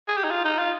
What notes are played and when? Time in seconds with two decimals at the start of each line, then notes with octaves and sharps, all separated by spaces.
0.08 G#4
0.17 G4
0.24 D#4
0.31 F4
0.45 D#4
0.59 F4